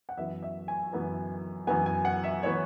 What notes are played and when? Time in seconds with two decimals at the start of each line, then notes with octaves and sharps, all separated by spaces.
0.09 F#5
0.17 F#2 E3 B3 E5
0.43 E5
0.68 G#5
0.92 F#2 E3 B3
1.67 F#2 E3 B3 G#5
1.86 G#5
2.05 F#5
2.24 E5
2.43 E3 B3 C#5